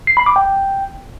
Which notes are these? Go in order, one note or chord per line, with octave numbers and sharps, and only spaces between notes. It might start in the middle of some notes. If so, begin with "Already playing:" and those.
C7
B5
D6
G5